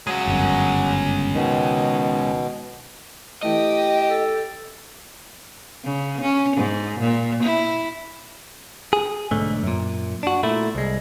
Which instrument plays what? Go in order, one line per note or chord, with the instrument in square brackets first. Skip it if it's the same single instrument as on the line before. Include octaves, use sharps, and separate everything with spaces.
[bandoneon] F#3 [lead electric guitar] G#3 C#4
[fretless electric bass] G1 F#2
[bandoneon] B2 [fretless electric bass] D#3
[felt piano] E3 A3 [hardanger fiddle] G4 G5 [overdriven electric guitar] D#5
[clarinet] A4
[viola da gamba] C#3
C#4
G#2
A#2
E4
[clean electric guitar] G#4
B1 G#2 D3 A3
F#2 A#2
D4 F#4
A#2 A3 E4
C2 G#3